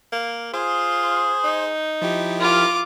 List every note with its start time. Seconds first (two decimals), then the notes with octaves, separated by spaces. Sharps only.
0.12 A#3
0.54 F4 G#4 C5
1.44 D#4
2.02 F3 E4 G4
2.40 F4 A#4 D6